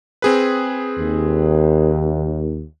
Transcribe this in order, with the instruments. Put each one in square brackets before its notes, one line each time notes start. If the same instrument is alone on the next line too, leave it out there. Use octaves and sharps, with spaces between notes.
[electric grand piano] C4 G#4 B4
[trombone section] D#2